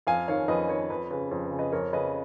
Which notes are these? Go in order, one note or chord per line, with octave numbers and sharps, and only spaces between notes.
F2 F5 G#5
D#3 C#5 F5
F2 B4 D#5
D#3 A#4 C#5
F2 B4
C#3 B4
F2
B4
C#3
B4 D#5
F2 A#4 C#5
C#3 B4 D#5